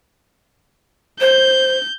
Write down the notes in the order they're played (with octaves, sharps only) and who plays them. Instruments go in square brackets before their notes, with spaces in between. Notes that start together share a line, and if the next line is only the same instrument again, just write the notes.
[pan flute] C5 [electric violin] G6